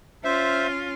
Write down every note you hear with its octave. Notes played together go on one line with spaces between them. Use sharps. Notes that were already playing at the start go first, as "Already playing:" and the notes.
C#4 F4 C5 E5